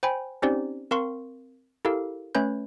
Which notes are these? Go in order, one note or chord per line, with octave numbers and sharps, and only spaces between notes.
C5 G5 G#5 B5
C4 C#4 D#4 G4 C5 D5
C4 A#4 F5 C6 C#6
E4 G4 A4 A#4 F5
A3 C#4 B4 C#5 B5 G6